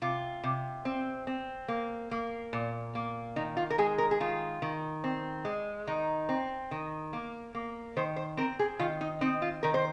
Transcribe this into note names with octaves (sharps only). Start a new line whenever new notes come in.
C3 F4
C3
C4
C4
A#3
A#3
A#2
A#3
D#3 D#4
F4
A#4
G#3 G#4
A#4
G#4
D#3 F4
D#3
C4
G#3
D#3 D#4
C4
D#3
A#3
A#3
D#3 C5
C5
C4 A#4
G#4
D#3 F4
D#4
C4 D#4
F4
D#3 A#4
C5